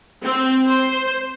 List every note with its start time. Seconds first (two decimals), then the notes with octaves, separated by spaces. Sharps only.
0.24 C4
0.67 C5